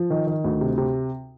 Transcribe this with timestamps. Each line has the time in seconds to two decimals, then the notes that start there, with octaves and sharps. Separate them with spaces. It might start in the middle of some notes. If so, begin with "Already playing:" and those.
Already playing: F3
0.10 D#3
0.27 D#3
0.44 D2
0.61 C3
0.78 C3